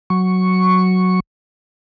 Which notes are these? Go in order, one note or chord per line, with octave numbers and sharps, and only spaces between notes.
F#3 C#6